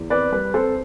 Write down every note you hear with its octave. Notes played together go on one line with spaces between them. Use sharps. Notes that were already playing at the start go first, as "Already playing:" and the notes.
Already playing: E2
C4 B4 D5
G3 B4
C4 A4 C5